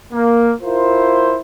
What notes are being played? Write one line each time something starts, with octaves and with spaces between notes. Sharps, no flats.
A#3
E4 F4 A#4 C5